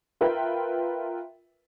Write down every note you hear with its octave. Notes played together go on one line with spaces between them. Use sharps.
F4 A#4 B4 E5 G5